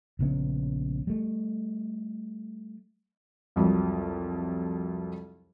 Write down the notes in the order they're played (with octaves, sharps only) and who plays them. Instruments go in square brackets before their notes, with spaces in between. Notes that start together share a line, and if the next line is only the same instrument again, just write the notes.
[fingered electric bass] A#1 C#3 B3 C#4
G3 A3
[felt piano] C2 F2 F#3